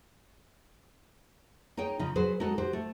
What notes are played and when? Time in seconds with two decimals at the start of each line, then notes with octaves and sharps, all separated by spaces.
1.77 D#4 G#4 C#5 G5
1.99 C#3 F3 D#4
2.16 F#3 G#4 B4 C5
2.40 G#3 D#4 F#4 A4
2.58 F#4 G4 C5
2.73 A3